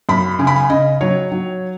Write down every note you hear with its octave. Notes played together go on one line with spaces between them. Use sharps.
F#2 B5
C#3 G#5
B5
G#5
C#3 D#5
F#3 C#5
F#3